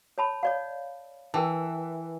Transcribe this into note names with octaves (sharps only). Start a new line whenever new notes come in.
C#5 A5 B5
C#5 D5 F5
E3 A#4 G5 A5